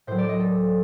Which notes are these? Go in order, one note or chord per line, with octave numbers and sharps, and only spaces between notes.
A2 F#3 C5
D5
D#5
A4